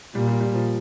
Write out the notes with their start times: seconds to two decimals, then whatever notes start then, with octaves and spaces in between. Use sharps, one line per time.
0.14 A#2 G3
0.28 G3
0.41 G3
0.54 F3